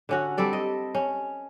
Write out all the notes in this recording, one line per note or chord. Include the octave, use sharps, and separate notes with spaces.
D3 C#4 F#4
G3 C4 A4 D5
D#5
C#4